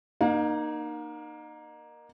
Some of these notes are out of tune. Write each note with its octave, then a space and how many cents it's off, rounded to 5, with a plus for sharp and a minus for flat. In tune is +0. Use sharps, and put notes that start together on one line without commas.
A#3 +10 D#4 -25 F5 +45